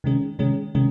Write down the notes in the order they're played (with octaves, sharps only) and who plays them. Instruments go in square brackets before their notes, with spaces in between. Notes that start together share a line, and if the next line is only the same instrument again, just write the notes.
[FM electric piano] C3 D#3 G#3 C#4
C3 D#3 G#3 C#4
C3 D#3 G#3 C#4